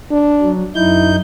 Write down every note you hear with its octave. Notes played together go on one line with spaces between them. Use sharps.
D4
F#3
F#2 D#4 E4 G6